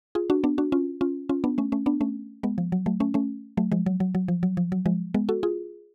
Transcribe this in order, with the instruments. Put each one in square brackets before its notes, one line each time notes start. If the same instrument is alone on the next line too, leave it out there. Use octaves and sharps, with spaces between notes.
[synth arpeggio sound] F4 G#4
D4 F#4
B3 D4
D4 F#4
C#4 F4
C#4 F4
C#4 F4
B3 D4
A3 C#4
A3 C#4
B3 D4
A3 C#4
G#3 B3
F3
F#3
F#3 A3
A3 C#4
A3 C#4
F#3 A3
F3 G#3
F#3
F#3
F#3
F3
F#3
F3
F#3
F3 G#3
G#3 B3
F#4 A4
F4 G#4